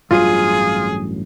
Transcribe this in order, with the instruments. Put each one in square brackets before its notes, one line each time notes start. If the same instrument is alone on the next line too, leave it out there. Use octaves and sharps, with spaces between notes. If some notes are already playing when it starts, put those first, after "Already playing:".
[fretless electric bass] A1 G2 F#3 [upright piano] F4 [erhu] G#4